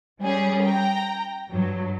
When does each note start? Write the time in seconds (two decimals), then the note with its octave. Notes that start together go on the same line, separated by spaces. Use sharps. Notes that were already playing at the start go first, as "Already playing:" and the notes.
0.21 G3 C#4 G#4
0.62 G5 A#5
1.51 G2 F#3